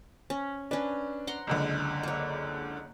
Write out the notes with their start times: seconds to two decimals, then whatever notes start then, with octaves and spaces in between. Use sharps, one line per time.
0.30 C#4
0.71 C#4 D4 B4
1.27 F#5 A#5 C6
1.47 F#1 C#2 D3
2.03 A#3 C#5